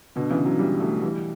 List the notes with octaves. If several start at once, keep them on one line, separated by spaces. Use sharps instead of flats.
B2 D3
C#3 E3
D3 F#3
E3 G3
F#3 A3
E3 G3